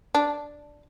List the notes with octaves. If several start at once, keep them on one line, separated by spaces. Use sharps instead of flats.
D4